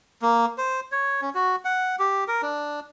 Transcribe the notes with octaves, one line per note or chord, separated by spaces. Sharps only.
A#3
C5
C#5
C#4
F#4
F#5
G4
A#4
D4